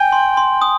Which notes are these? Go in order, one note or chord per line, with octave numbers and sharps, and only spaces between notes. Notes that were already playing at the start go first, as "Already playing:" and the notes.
Already playing: G5 G#5
C6
C6
D#6